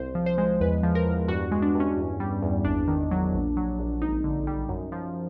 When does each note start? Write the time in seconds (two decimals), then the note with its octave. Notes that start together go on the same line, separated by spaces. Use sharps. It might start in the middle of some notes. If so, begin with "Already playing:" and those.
Already playing: C2 C5
0.15 F3
0.26 C5
0.38 G#3
0.60 E2 B4
0.83 F3
0.95 A#4
1.06 E2
1.28 G2 F#4
1.51 G#3
1.62 D4
1.75 G2
1.80 C#4
1.98 E2
2.20 G3
2.43 E2
2.65 G#1 D4
2.88 D#3
3.11 F#3
3.33 A#1
3.57 F#3
3.79 A#1
4.02 G#1 D#4
4.24 D3
4.47 G3
4.69 F#2
4.92 F3